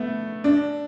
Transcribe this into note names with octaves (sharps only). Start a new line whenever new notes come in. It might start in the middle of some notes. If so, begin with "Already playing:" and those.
Already playing: A3 B3
D4